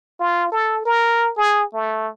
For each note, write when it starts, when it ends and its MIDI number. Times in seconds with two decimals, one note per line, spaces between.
0.20 0.50 65
0.52 0.82 69
0.85 1.32 70
1.37 1.64 68
1.74 2.09 57